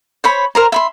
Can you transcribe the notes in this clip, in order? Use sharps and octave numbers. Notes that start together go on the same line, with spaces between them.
C5 C#5 B5
A#4 C5 A#5
E5 B5 C6